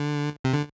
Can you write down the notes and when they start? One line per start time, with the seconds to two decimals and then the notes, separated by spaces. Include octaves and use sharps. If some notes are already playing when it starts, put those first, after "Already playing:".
Already playing: D3
0.44 C3
0.53 D3